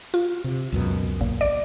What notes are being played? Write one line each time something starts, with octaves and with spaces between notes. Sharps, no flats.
F4
C3
C#2 F#2 B2
A#1
D5